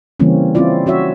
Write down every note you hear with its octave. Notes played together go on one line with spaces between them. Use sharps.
C#3 E3 G3 A#3 C4 C#4
C4 C#4 E4 F4 D5
C#4 F#4 C#5 E5